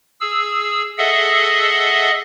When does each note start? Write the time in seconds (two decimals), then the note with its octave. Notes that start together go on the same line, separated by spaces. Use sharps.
0.21 G#4 E6
0.98 G#4 A4 D#5 E5 F#5